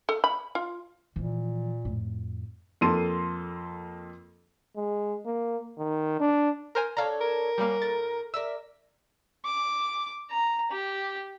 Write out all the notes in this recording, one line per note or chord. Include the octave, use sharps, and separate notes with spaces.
A4
B5
F4
A#2 E3 F3
F2 A2
F2 A#3 A4 C6 D#7
G#3
A#3
D#3
D4
A#4 C5 G#5
D4 A4 C#5 F5 A#5
A#4
G3 A#3 C#4 F#4
A2 A6
A#4 D5 E5 E6
D6
A#5
G4